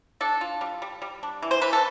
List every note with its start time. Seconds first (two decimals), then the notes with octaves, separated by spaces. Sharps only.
0.21 D4 A4
0.41 F4
0.61 G3
0.82 G3
1.02 G3
1.23 D4
1.42 E3
1.51 C5
1.62 E3 B4
1.73 A4